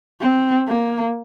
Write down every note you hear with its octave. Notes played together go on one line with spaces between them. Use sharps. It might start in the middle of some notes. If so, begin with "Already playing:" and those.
C4
A#3